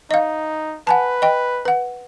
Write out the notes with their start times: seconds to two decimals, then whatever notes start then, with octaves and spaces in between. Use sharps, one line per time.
0.11 D#4 D#5 F5
0.87 B4 F#5 G#5 A5
1.22 D#5 G5
1.65 B4 F#5